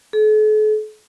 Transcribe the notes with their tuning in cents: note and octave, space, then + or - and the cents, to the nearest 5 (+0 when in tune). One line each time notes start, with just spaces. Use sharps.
A4 -45